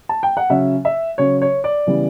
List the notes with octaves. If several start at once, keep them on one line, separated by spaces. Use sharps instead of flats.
A5
G5
F#5
C#3 F#3 C#4 E5
E5
C#3 F#3 C#4 C#5
C#5
D5
C#3 E3 G3 B3